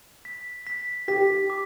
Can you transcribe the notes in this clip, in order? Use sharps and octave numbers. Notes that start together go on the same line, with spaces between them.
B6
B6
G4 B6
D6